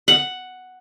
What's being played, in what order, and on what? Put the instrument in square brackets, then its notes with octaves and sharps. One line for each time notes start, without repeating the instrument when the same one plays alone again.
[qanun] F#5